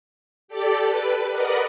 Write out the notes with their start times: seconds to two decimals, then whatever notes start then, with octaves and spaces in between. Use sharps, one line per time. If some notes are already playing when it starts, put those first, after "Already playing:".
0.48 G4 A4 D5 A5
0.81 B4
1.29 A#4 B4 D5 D#5 F#5